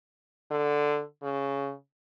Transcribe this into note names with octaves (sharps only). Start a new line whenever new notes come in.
D3
C#3